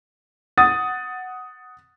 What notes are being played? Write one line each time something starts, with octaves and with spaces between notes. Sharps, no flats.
F#5 D#6 A6